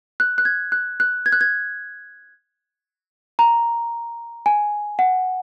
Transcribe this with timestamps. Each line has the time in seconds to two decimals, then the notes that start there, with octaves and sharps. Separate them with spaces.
0.20 F#6
0.38 F#6
0.45 G#6
0.72 F#6
1.00 F#6
1.26 G#6
1.32 F#6
1.41 G#6
3.39 A#5
4.46 G#5
4.99 F#5